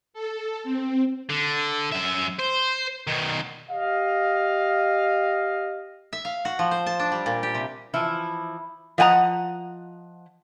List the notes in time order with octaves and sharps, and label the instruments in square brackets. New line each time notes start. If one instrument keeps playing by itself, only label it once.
[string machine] A4
C4
[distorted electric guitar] D3
F#2 E5
C5
B2 D#3
[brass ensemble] G4 D#5 F5
[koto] E5
F5
F#4
F3
C5
A5
D4
G3
A#2
G4
C3
[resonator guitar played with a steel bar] E3 F3 E4
F3 D#5 F#5 G#5 A#5